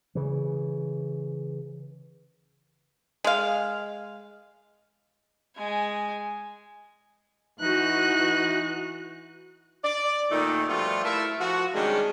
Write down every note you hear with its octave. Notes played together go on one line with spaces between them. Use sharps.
C#3 E3
G#3 F5
G#3 G#5
E3 D#4 F#4 F#6
D5
A#2 D#3 A3 D#4
B2 F3 G3 A3 B3 F4
A3 E4 A4 A#4 E5
F3 F#4
C3 D#3 G3 G#3 C#4 D4